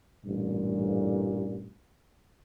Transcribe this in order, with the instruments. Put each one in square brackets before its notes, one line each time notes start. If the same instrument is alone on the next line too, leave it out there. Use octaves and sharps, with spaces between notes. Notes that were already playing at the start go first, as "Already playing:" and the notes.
[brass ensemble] A1 G2 A#2